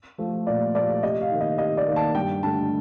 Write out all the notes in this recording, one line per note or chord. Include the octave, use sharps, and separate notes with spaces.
F3 A3
A#2 D5
F3 A3 D5
C3 D#5
F5
D#3 A#3
D#5
C3 D#5
D5
D#3 A#3
A5
G2 G5
D3 A3 A5